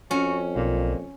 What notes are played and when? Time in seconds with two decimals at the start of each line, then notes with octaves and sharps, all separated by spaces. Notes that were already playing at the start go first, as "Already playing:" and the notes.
0.11 F2 C#4 F#4
0.56 B1 A#2